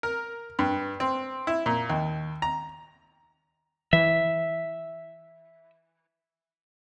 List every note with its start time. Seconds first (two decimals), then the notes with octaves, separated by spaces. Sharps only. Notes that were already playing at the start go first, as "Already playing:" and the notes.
0.03 A#4
0.59 G2
1.00 C4
1.47 E4
1.66 A#2
1.90 D#2
2.42 A#5
3.93 E3 E5